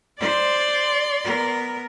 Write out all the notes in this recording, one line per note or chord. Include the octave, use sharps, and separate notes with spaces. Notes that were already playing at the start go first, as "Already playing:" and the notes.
C5 D5 C6
B3 A#4